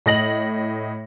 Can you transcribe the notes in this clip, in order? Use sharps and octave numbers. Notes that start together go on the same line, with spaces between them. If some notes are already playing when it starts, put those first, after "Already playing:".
A2 D#5 A#6 F#7